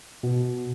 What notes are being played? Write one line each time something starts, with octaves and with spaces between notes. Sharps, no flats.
B2